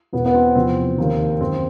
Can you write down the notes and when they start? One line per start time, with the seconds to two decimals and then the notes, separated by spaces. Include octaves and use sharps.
0.13 E2 B2 B3
0.25 B3
0.34 C4
0.55 E2 C3 F3 C4
0.98 D#2 D#3
1.41 F#2 D#3 C4